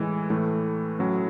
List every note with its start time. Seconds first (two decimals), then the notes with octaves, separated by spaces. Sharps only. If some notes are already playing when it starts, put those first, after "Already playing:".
Already playing: A2 E3 G#3
0.30 A2 E3 A3
0.99 A2 F#3 C#4 F#4